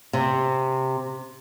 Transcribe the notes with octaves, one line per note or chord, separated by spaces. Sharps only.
C3